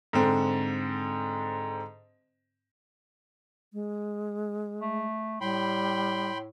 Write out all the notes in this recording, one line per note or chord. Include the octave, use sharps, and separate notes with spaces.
G#2 D3 C4
G#3
A3
A2 G3 G5 B5 C6